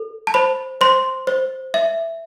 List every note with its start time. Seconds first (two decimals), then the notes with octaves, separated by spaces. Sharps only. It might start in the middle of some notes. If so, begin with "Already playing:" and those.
Already playing: A4
0.27 A5
0.34 C5 B5
0.81 C5 C6
1.27 C5
1.74 E5